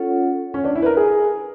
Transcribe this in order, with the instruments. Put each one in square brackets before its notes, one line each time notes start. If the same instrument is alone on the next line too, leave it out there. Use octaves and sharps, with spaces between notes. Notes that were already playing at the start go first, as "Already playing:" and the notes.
Already playing: [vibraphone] C#4 F4 A4 C#5 F#5
[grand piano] C#4
D4
E4
B4
A#4
G#4